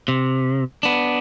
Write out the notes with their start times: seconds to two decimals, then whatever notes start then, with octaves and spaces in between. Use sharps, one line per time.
0.08 C3
0.83 B3 D4